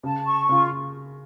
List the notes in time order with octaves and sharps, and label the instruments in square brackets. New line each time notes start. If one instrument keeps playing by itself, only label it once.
[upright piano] C#3 [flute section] A5
[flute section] C#6
[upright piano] C#3 [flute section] F4